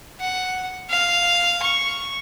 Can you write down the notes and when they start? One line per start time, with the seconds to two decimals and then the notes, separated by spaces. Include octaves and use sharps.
0.21 F#5
0.90 F5
1.62 C#6